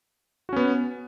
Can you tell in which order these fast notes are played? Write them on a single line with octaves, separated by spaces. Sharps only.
F#4 C#4 B3